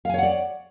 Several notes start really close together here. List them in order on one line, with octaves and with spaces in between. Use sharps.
F5 G#5 C#5 F#5 D5